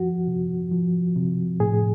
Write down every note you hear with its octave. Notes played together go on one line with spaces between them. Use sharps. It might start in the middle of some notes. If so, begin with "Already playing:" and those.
Already playing: F3 F#4
C3
F3
C3
A2 G#4